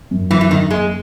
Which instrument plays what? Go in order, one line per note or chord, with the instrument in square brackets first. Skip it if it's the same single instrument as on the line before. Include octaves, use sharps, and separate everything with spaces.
[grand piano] F#2
[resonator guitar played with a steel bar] E3 [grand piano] F#3
[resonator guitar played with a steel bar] E3
[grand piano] F#2 [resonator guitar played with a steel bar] D#3
[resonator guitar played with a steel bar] G#3 [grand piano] A#3